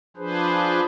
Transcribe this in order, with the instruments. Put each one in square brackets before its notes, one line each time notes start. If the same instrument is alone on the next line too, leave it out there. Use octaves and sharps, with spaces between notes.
[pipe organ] F3 D4 G#4 B4 C5